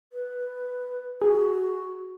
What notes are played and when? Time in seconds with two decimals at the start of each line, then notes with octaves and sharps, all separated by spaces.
0.13 B4
1.22 F#4 G#4